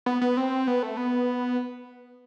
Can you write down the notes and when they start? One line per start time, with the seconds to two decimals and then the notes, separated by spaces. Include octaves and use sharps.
0.06 B3
0.21 B3
0.37 C4
0.67 B3
0.83 A3
0.97 B3